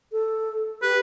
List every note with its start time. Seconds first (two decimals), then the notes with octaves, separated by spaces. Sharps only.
0.12 A4
0.82 G4 B4